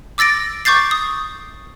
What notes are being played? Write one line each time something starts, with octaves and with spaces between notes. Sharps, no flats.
D6 E6 A6 A#6 D7
C#6 D6 G6 A6 C7
D#6